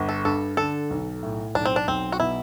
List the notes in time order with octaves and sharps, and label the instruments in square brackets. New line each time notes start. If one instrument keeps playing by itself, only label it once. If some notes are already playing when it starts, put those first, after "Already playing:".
Already playing: [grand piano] G1
[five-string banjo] A4
[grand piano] G2 [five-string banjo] A4
[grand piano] D3 [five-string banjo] A4
[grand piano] B1
A2
[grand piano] B1 [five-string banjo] D4
[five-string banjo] C4
D4
[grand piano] B1 [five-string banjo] C4
[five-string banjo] F#4
[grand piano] B2 [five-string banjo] E4